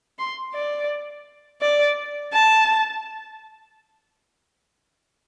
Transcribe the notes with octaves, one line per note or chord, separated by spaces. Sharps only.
C6
D5
D5
A5